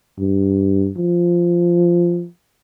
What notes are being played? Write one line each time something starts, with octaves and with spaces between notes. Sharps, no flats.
G2
F3